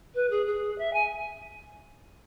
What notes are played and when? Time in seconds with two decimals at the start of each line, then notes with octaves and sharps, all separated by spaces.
0.14 B4
0.30 G#4
0.46 G#4
0.78 E5
0.93 G#5